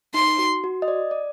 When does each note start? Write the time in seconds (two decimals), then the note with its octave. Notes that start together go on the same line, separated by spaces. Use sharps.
0.14 D#4 C6
0.38 F#4
0.64 F#4
0.82 D#5
0.88 D5
1.11 D5